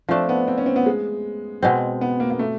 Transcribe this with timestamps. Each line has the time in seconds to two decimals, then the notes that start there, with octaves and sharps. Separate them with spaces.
0.09 F3 A3 C4 D4
0.29 B3
0.48 C4
0.58 C#4
0.66 C4
0.76 B3
0.86 G#3
1.63 B2 G#3 C4
2.01 B3
2.20 A#3
2.30 A#3
2.39 A3